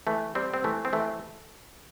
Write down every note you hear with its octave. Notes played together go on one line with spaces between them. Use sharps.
E3 A3
G3 C4
C4
E3 A3
C4
E3 A3